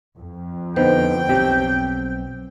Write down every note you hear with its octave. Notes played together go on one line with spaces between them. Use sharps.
F2
D3 B3 D#4 C5 G5
B1 C4 G4